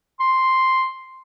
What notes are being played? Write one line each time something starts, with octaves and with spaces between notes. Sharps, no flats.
C6